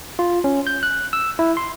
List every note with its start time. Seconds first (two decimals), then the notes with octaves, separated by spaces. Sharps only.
0.19 F4
0.44 C#4
0.67 G6
0.83 F#6
1.13 E6
1.39 E4
1.57 C6